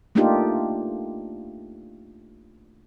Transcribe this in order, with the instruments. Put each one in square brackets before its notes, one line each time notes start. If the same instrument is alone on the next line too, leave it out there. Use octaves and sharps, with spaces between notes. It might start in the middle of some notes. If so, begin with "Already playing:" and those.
[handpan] A3 A#3 D4 D#4 F4 G4